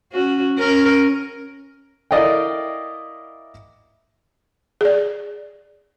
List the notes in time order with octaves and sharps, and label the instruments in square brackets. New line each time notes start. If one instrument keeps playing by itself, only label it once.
[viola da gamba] C#4 F#4
C#4 A#4
[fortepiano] E4 A#4 D5 D#5 F5 G5
[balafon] G#4 D5